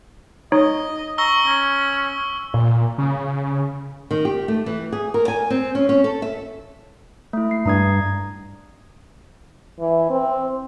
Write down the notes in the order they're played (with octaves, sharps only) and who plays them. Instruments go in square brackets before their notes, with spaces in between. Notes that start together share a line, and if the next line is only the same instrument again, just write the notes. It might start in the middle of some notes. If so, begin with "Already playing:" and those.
[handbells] D#4 C#5 [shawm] D#5
[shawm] A#5 [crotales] C#6 E6 G7
[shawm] C#4
[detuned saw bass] A#2
C#3
[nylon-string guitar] D#3
G4
A3
E3
G#4
A#4
G#5
C4
C#4
C#4
A4
E5
[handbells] A3 E4
C7
[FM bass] G2 [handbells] A#5 D#6 G#6
[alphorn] E3
C4